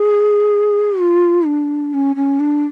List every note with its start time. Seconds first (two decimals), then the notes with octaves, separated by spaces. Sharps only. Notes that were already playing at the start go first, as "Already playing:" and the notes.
Already playing: G#4
1.01 F4
1.47 D4
1.94 C#4
2.16 C#4
2.40 D4